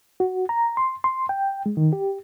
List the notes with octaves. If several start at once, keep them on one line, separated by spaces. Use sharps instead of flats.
F#4
A#5
C6
C6
G5
G#3
D#3
G4